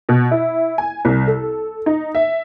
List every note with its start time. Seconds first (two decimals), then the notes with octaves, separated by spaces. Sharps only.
0.09 B2
0.31 E4
0.78 G#5
1.05 C2
1.27 A4
1.86 D#4
2.15 E5